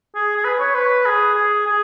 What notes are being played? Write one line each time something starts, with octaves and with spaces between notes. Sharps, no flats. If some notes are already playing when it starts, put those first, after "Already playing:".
G#4
G#4
B4
C#5
B4
G#4
G#4
G#4